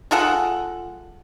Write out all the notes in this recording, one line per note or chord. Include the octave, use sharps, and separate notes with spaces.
G#3 F4 A4 F#5